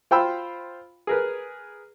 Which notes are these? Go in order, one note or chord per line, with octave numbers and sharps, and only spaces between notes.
F4 C5 F5 G5 B5 E6
G#4 A#4 B4